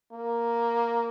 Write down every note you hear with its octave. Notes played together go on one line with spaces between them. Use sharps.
A#3